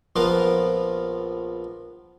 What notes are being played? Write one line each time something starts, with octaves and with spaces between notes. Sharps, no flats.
A#1 F3 B3 F4 A#4 F5